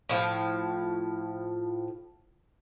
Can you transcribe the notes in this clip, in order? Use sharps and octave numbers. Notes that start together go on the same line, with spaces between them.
A2 F3